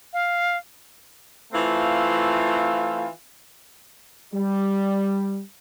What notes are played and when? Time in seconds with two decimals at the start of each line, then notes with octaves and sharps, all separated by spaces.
0.13 F5
1.52 E3 A3 C4 F4
4.34 G3